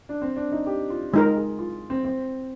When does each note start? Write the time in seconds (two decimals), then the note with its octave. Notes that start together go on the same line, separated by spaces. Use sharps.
0.09 D4
0.22 C4
0.36 D4
0.52 D#4
0.67 G4
0.90 F4
1.13 G#3 D#4 F4 A#4
1.37 G#4
1.59 F4
1.90 C4
2.05 C4